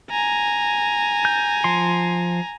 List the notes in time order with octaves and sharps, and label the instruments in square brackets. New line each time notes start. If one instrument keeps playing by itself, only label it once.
[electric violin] G#5 A#5
[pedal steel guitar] G6
F3 C6